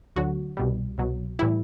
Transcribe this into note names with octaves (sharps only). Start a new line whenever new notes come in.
D2 D3 F#3 F#4
C2 B2 G3
C2 B2 F#3
A2 E3 G3 E4